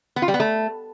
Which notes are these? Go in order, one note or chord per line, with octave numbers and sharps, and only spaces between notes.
B3
F4
G3
B3
A3